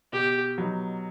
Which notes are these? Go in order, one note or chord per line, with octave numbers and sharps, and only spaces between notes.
B2 G4
F#3 B3 D#4